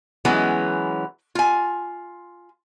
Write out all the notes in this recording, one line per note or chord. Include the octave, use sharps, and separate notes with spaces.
E3 F#3 G#3 B3 C#4
F4 G#5